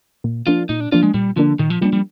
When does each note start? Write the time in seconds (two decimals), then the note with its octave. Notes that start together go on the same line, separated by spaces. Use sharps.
0.24 A#2
0.47 F3 A#3 D4 F4
0.69 A#2 D#4
0.80 D4
0.92 F3 A#3 D4 F4
1.03 G#3
1.14 A#2 G3
1.36 D3 F3 A#3 D4
1.59 A#2 D#3
1.70 F3
1.81 F3 G3 A#3 D4
1.93 G3